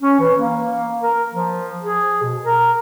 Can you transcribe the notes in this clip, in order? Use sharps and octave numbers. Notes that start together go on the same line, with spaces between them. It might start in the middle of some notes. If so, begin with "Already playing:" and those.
C#4
E3
A#3
A#4
F3
G#4
B2
A#4